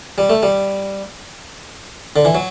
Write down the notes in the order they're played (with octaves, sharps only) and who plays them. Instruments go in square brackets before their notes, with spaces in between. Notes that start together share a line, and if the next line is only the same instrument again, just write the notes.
[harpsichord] G3
A3
G3
D3
E3
F#3